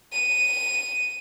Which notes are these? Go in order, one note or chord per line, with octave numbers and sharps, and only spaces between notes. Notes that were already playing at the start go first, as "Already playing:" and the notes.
D#7